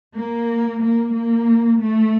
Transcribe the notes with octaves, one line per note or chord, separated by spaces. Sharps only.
A#3
A#3
A#3
A3